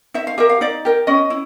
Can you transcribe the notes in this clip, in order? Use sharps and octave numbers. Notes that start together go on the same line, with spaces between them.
D#4 E5
F5
G4 A#4 E5
F5
D#4 D5
G4 A#4
C#4 D#5
E4